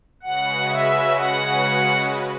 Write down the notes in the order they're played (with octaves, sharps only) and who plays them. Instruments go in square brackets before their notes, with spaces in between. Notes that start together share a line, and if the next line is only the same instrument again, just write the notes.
[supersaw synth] C#3 G#3 C#4 F#4 B4 [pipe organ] F#5
[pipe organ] E5
F#5